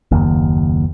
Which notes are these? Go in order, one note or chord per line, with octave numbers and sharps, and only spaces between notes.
F#1 D#2